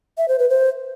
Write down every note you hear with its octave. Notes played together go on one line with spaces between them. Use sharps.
E5
C5
B4
C5